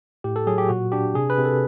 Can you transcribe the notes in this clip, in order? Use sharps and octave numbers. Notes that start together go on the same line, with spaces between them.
A2 G4
A4
F#3 G#4
G4
A#2 F#4
D4 G4
C3 G#4
B4
C3
A4